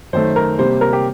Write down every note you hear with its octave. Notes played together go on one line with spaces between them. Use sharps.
F#2 D#3 A3 C5
A#4
C3 G3 A#3 C5
A#4
G4